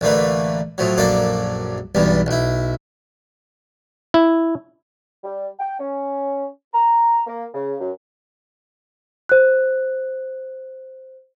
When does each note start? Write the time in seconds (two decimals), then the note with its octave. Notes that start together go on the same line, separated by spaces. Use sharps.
0.01 A1 D3 A3 A#3 B4
0.78 A2 F3 F#3
0.98 A#1 F#2 A#3 D4 A4
1.95 B1 E2 G2 G3
2.26 B1 E4
4.14 E4
5.24 G3
5.59 G5
5.79 C#4
6.74 A#5
7.27 A#3
7.54 C#3
7.80 F#2
9.29 C5 F#6